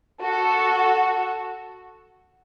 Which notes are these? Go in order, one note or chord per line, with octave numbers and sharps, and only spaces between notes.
F#4 A4